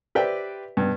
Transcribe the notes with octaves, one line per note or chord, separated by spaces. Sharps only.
G4 B4 C5 D5 E5 G5
G2 B2